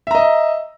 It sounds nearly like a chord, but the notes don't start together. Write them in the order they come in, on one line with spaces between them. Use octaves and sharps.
E5 A#5 D#5